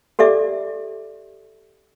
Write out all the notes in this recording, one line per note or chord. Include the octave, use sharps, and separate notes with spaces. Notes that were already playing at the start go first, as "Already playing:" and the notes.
G4 A4 D5 E5 D6